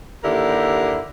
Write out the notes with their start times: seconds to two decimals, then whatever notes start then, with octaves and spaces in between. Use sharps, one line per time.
0.23 D#2 D3 E4 G4 A#4